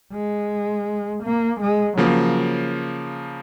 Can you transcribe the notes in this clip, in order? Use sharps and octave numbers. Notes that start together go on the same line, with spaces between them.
G#3
A#3
G#3
C#3 F3 F#3 A#3